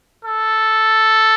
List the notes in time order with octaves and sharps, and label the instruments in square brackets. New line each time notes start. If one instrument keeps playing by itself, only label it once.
[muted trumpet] A4